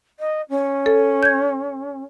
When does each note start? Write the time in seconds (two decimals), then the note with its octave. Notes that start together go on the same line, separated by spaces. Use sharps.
0.20 D#5
0.50 C#4
0.86 A4
1.23 G6 G#6